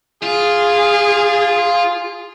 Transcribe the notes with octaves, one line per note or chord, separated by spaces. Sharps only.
F4 G#4